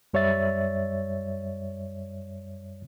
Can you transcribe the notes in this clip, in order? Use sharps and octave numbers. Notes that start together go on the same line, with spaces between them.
F#2 G3 C#5 D5 E5 A6